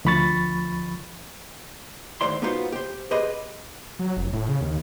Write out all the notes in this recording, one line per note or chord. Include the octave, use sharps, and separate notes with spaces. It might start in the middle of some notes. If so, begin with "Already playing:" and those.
D2 F3 B5 C#6 A6
D#2 A2 C5 D5 C6
A#3 B3 D#4 F4 F#4 C5
G4 C5
G4 G#4 B4 C5 D#5
F#3
F1
A2
C#3
D#2